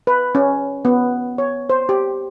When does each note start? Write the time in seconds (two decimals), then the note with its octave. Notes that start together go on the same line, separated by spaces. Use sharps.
0.07 B4
0.35 C#4
0.85 B3
1.38 C#5
1.70 C5
1.89 G4